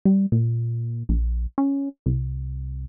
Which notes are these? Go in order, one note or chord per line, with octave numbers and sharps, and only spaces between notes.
G3
A#2
A#1
C#4
C2